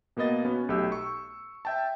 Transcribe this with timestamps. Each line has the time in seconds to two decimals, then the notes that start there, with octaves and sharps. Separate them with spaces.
0.17 B2 A#3 B3 D#5 A6
0.45 B3 C#4 F#4
0.69 B1 A3 G4 E6
0.92 C#6
1.65 E5 G5 A5